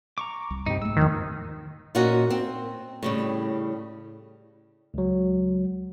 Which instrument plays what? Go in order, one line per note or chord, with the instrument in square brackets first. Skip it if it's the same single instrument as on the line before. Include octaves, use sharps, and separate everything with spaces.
[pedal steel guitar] A#5 C#6 D6
[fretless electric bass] C2
[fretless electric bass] G2 C3 [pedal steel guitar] G3 D#4
[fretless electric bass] G#2 A3 [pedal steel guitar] E6
[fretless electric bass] E2 F3 [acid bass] D#3
[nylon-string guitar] A#2 A#3 C#4 D#4 F#4
C4
A2 C#3 G3
[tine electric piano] C#2 F#3